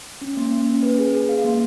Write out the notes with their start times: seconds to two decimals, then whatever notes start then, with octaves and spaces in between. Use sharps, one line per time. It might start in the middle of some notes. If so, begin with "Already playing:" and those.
0.21 C#4
0.37 A#3
0.52 A#3
0.68 C#4
0.83 B4
0.99 G#4
1.14 G#4
1.29 F5
1.45 A#3